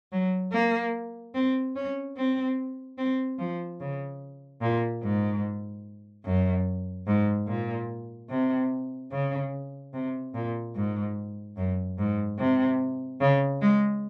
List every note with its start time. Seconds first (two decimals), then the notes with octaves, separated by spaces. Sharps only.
0.12 F#3
0.52 A#3
1.34 C4
1.76 C#4
2.17 C4
2.98 C4
3.38 F3
3.80 C#3
4.62 A#2
5.03 G#2
6.25 F#2
7.07 G#2
7.47 A#2
8.30 C3
9.11 C#3
9.93 C3
10.35 A#2
10.76 G#2
11.57 F#2
11.98 G#2
12.39 C3
13.21 C#3
13.61 G#3